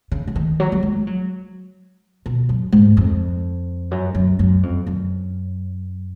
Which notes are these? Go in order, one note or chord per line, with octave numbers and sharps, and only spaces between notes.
C#3
C#3
D#3
F#3
F#3
G#3
F#3
B2
F#2
G#2
F2
F#2
F#2
F#2
F2
F#2